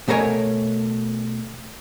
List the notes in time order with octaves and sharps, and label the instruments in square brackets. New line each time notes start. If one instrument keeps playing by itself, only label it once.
[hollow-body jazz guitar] B2 A3 A#4 C5 C#5 G#5